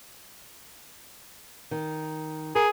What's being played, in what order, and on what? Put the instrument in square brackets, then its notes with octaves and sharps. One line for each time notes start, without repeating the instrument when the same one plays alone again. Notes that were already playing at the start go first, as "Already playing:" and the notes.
[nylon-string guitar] D#3
[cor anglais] G#4 [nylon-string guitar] A#4